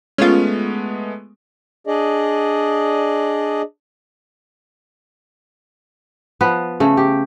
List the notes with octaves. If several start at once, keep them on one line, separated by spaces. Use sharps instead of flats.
G#3 A3 B3 C#4 F4
D4 G#4 D5 D#5
F3 B3 B4
C#3 A3
G4